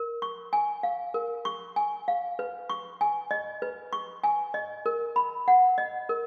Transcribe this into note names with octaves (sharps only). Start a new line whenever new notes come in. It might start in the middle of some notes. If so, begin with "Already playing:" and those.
Already playing: A#4
C#6
G#5
F5
A#4
C#6
G#5
F5
B4
C#6
G#5
D#5
B4
C#6
G#5
D#5
A#4
B5
F#5
D#5
A#4